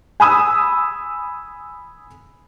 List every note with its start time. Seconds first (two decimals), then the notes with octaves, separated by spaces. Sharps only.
0.20 G#5 B5 D#6 E6